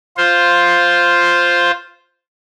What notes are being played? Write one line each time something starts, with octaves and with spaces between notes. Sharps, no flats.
F4 C5